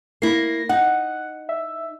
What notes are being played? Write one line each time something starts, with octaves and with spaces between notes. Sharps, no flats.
A#3 E4 A#6 C7
D#4 F#5
E5